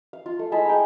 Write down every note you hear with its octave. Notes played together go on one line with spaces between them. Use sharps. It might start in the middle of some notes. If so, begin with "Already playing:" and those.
F5
F4
A3
G#3 E4 A5 B5
G5 A#5